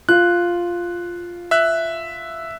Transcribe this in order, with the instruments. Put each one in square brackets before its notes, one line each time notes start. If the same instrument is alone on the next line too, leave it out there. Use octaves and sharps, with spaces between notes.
[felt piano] F4 [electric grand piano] F#6
[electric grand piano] E5 F#6